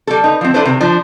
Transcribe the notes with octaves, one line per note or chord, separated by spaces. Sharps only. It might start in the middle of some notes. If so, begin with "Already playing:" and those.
G3 A4
D#4 B4
F3 C4
D4 E4 A4 B4 C5
C3 D#3
F3 D4